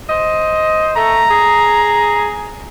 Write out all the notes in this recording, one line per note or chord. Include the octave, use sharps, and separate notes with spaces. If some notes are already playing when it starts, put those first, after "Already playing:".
C5 D#5
A3 A#5
G#4